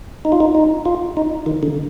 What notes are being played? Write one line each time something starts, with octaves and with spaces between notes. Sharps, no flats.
D#4
F4
D#4
D#4
F4
D#4
D#3
D3